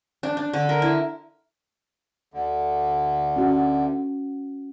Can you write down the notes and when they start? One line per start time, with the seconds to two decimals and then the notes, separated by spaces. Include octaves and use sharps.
0.23 D4
0.37 D4
0.53 D3
0.69 A#4
0.82 E4
2.34 D2 D3
3.36 C#4 F#4